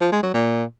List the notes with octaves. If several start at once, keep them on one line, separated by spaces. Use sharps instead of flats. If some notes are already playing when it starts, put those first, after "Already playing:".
F3
G#3
F#3
A#2